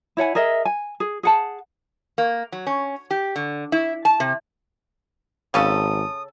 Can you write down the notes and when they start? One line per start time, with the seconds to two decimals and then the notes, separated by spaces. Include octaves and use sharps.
0.17 E4 C#5 F#5 G#5
0.35 G#4 A#4 D#5 E5
0.65 G#5
1.00 G#4
1.23 G#4 F#5 A5
2.18 A#3
2.52 F#3
2.67 C#4
3.11 G4
3.36 D3
3.72 E4
4.05 A5
4.20 C3
5.54 G#1 C#3 C#4 A4 F5 D#6